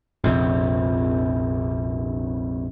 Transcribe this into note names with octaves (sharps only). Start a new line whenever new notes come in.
A#1 F2 C3